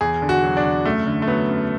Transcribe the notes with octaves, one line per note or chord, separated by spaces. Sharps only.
E2 G#4
D3
F#4
F#3
D4
E2
F#2 A3
D3
A3
F#3 B3
F#2